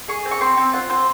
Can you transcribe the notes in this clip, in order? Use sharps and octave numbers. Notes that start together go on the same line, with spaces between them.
G#4 C#6
C4
C#6
C4 C6
C4
F4 F#5
C4 C5